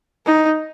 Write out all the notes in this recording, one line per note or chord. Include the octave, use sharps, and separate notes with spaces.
D#4